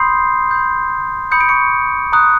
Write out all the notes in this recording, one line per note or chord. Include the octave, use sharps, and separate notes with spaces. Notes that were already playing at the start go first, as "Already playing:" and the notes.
Already playing: B5 C6 D#6 G6 C7
B5 D#6 G6
B5 D#6 G6 C#7
D7
C#6 C#7
A#5 D#6 F#6